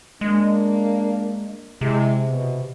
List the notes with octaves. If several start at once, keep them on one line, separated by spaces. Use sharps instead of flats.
G#3 A#3 D4
C3 G#3 E4
B2